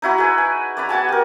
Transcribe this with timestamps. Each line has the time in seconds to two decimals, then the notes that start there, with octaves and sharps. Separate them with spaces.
0.02 D#4 E4 F#4 B5
0.18 G#4 B4
0.38 G#5
0.77 D5 A#5 B5
0.89 B3 F#4 G#5 A5
1.09 G4 A#4